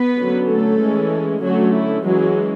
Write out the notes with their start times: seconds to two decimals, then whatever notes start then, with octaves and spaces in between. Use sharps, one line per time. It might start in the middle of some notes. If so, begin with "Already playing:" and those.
Already playing: B3 B4
0.19 D3 F#3 C#4
0.49 A3 A4
0.81 E3 G#3 C#4
1.42 D3 F#3 A3 C#4 F#4
1.74 E4
2.04 E3 F#3 G#3 C#4 F#4